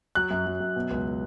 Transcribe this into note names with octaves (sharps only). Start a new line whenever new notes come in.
F#3 F#6
F#2
F#3
F#2
B2
C#2